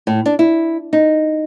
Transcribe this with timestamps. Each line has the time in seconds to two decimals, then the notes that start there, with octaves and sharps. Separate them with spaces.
0.07 A2
0.26 D4
0.39 E4
0.93 D#4